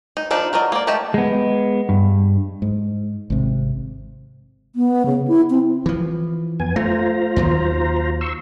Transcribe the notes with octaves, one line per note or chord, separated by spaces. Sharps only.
D#4
F3 D4 D#4
F#3 A#4 D5 D#5
A#3 D5
A3 G4 D#5 A5
G#3 B3
G2
G#2
G#1 C3
B3
C#3
E4
C4
E3 F3
F2 B3 G#5
A3 F4 C5 A#5
D#2 D#3 F#3
C6 C#6 E6